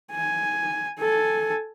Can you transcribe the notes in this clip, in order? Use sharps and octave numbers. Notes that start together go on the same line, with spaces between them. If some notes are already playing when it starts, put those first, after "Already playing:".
G#5
A4 G#5